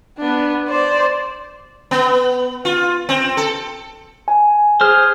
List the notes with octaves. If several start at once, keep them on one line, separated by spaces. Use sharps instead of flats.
B3 D4
C5 D5
B3
F4
C4
A4
G#5
G#4 C5 F6